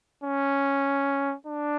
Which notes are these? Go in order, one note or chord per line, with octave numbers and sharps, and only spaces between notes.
C#4
D4